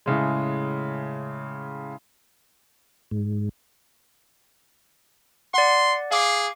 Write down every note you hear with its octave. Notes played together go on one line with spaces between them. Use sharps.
A2 C#3 G#3
G#2
D5 F#5 C6
G#4 F5 D6 C7